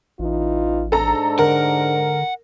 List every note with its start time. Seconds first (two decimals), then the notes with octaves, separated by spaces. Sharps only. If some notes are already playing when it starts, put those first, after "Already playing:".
0.19 A1 E3 D#4 F4
0.92 G#2 D4 A4 A#5
1.39 D3 A#4 F#5